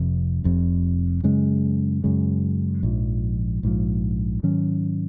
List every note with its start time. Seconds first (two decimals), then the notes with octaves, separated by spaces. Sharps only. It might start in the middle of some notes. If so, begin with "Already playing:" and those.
Already playing: F1 F2 C3
0.44 F1 F2 C3
1.23 F#2 C#3 G#3
2.04 F#2 C#3 G#3
2.83 A#1 G#2 F3
3.63 A#1 G#2 F3
4.43 G#2 D#3 F#3 C#4